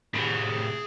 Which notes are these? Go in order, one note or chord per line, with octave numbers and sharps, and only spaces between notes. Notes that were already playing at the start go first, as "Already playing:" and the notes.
A2 C3 G#4 B5